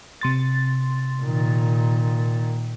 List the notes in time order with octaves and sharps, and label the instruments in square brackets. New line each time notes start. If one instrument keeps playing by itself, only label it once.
[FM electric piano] C3 C6 A6
[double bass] A#2 D#3